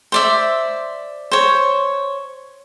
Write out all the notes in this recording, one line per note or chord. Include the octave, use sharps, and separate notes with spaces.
C5 D5 E5
C5 C#5